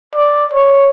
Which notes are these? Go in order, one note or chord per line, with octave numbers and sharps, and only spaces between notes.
D5
C#5